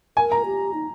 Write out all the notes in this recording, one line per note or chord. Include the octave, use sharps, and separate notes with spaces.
A#4 G#5
A#5
G4
D#4